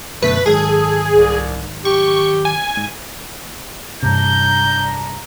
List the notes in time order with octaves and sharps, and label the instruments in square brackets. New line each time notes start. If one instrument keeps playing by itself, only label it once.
[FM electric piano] F#2 B2 D3 [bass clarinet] A3 [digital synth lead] B4
[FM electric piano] G#2 D#3 F#3 [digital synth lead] G#4 [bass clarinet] A4
[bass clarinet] C2
[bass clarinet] G4 [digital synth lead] C#6
[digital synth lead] G#5
[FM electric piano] G#2
[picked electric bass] G2 C3 [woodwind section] D4 A#5 [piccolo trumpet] G6